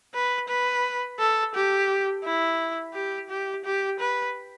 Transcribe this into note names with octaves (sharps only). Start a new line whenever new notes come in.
B4
B4
A4
G4
E4
G4
G4
G4
B4